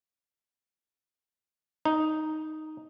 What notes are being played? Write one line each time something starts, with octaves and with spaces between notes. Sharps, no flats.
D#4